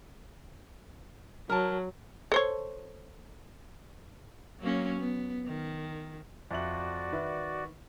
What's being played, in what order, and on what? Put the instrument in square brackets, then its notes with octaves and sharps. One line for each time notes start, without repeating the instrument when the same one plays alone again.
[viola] F#3 [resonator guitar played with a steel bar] A#4 A5
[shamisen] A4 C5 C#5
[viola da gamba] F#3 A#3 C#4
B3
D#3
[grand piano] F2 E5 F#7 [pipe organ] F#4 D5
[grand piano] D#3 B4 E5